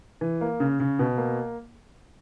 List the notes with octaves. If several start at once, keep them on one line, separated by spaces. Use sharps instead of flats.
E3
A#3
C#3
C#3
B2
A#3